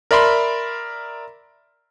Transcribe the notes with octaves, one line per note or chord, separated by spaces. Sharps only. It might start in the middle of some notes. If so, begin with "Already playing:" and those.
A#4 D5 E5 B5 C6